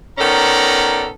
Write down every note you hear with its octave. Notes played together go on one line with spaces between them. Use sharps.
D#3 B3 C#4 A4 D5 A#5